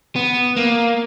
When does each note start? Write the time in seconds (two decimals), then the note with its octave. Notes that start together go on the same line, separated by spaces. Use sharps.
0.16 B3
0.56 A#3